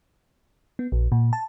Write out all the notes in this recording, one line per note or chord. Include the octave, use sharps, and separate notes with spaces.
B3
A#1
A#2
A5